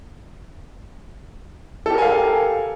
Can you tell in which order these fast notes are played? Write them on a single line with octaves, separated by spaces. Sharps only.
A4 G4 A#4 G#5 F5